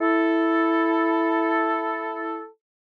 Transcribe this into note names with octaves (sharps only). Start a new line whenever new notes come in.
E4 A4